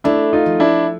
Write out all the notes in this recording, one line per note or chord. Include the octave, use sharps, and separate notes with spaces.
A3 D4 E4
D#4 F4
F3
D4 E4